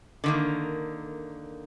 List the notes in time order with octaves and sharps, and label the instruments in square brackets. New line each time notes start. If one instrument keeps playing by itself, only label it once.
[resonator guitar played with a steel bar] D3 D#3 A#3